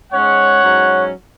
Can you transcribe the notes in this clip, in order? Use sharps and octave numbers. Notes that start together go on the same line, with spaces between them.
G#2 G#3 C#4 C#5 F#5
G#2 F#3 C#4